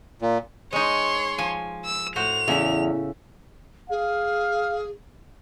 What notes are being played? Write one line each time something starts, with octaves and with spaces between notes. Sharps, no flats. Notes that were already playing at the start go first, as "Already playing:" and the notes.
A#2
G#3 D#4 C#5 C6
F3 G#5
E6
A2 F#4 C5 F7
E2 C#3 E5
G#4 F5